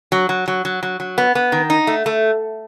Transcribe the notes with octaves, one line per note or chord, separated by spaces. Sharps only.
F#3
F#3
F#3
F#3
F#3
F#3
B3
B3
D#3
D#4
A3
A3